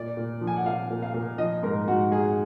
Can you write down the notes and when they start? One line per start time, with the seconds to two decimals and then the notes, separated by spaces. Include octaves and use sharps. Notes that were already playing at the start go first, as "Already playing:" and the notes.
Already playing: A#2 D5
0.17 A#2
0.41 F3
0.47 G#5
0.56 F#5
0.65 A#2 F5
0.90 A#2
1.02 F5
1.14 A#2
1.38 F3 D#5
1.63 G#2 A#4
1.88 G#2 F#4
2.11 G#2 G#4